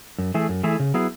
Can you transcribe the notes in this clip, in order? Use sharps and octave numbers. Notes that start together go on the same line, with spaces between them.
F#2
E3 A3 E4 G#4
F#2
E3 A3 E4 G#4
C#3
F#3 B3 E4 G#4